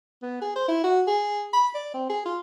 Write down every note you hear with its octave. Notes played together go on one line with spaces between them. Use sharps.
B3
G#4
C5
E4
F#4
G#4
B5
D5
C4
G#4
F4